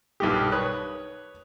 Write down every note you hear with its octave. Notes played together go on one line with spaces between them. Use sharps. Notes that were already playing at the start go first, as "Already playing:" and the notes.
B1 G2 G4
B4 C#5 D#6 F#6